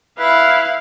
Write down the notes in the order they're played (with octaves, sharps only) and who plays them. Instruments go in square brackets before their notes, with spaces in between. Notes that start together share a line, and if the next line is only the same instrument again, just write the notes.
[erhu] E4 [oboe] B4 [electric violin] F5